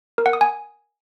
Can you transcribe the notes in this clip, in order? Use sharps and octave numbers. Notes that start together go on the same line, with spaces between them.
A#4
F#5
D#6
G#5